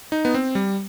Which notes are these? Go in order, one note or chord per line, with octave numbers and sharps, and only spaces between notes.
D#4
B3
C4
G3